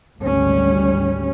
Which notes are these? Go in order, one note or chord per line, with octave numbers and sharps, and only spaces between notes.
G#1 D2 G3 C#4